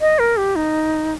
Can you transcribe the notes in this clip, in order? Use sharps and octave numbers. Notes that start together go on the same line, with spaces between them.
D#5
A#4
G4
D#4